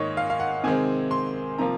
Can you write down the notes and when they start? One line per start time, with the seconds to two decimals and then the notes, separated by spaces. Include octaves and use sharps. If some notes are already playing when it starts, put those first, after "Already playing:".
Already playing: G#2 D#3 A#3 C#5 D#5
0.17 F5
0.30 F5
0.40 F#5
0.64 C3 D#3 G#3 C4 G#5
1.11 C6
1.58 C3 F3 A#3 A#5